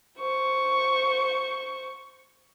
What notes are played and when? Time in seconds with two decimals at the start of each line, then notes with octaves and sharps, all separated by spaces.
0.19 C5 C#6